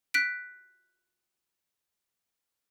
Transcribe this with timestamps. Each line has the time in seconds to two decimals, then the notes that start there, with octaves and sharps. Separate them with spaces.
0.14 F#6 B6 D7